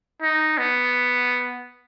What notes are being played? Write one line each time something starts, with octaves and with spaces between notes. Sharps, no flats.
D#4
B3